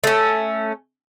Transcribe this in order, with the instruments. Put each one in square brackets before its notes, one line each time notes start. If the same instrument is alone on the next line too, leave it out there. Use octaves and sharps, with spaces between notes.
[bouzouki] A3 C#4